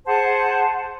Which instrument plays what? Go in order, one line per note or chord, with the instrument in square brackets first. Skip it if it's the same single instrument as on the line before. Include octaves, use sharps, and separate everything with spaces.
[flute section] G#4 C5 F#5 A5